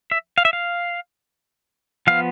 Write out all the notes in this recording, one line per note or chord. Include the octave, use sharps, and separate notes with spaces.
E5
F5
E5
F5
F3 B3 F5